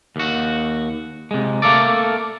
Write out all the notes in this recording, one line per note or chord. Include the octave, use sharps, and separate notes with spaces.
D#2 F#4
C3 G#3
A3 A#3 A4 D5